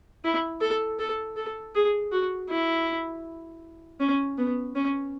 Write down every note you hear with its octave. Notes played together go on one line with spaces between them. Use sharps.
E4
A4
A4
A4
G#4
F#4
E4
C#4
B3
C#4